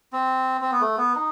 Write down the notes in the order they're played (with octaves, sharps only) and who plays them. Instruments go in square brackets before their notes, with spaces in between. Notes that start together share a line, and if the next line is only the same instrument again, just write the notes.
[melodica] C4
C4
B3
A3
B3
D#4